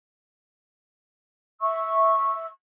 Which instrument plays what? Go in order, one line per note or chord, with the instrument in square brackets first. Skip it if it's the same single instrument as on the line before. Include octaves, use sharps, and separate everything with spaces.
[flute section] E5 C#6 E6